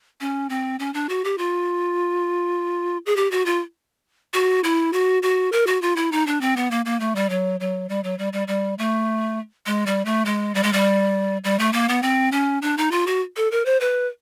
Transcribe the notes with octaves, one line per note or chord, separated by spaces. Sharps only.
C#4
C4
C#4
D4
F#4
G4
F4
G#4
G4
F#4
F4
F#4
E4
F#4
F#4
A#4
F#4
F4
E4
D#4
D4
C4
B3
A#3
A#3
A3
G3
F#3
F#3
G3
F#3
G3
G3
G3
A3
G#3
G3
A3
G#3
G3
G#3
G3
G3
A3
A#3
B3
C4
C#4
D4
D#4
F4
F#4
A4
A#4
C5
B4